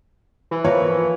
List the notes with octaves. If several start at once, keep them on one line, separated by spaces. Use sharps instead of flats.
E3
F3 A#4 C#5